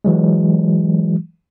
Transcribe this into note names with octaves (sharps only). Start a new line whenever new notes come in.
E3 F#3 G#3